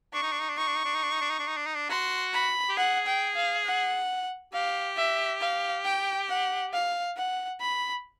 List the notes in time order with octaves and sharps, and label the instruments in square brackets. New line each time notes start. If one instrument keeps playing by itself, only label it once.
[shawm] D4 [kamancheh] C#6
[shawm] D#4
D4
D#4
D4
[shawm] D#4 [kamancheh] C#6
[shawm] D4
D#4
D4
D#4
D4
D#4
D4
D#4
D4
D#4
D4
D#4
D4
[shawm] F#4 [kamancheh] C6
[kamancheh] B5
[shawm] G4
[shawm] G#4 [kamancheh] F#5
[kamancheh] G5
F5
F#5
[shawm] G4 [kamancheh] F5
[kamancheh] E5
F5
G5
F#5
F5
F#5
B5